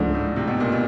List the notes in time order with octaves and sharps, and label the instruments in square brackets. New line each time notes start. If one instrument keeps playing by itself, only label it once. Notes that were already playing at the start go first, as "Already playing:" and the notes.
Already playing: [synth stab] C#2 C#3 F3 A3 D4 [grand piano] G#2
[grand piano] A2
C3
B2
A#2
B2